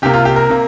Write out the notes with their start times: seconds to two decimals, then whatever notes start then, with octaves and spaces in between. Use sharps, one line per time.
0.02 C2 C3 A#3 G4
0.14 F4
0.25 G4
0.36 A#4
0.50 C3 A#3